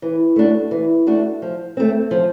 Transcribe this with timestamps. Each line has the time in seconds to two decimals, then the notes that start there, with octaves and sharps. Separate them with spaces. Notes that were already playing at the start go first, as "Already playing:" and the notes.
0.02 E3
0.36 A3 D4 F#4
0.71 E3
1.07 A3 D4 F#4
1.42 F3
1.77 A3 C4
2.11 F3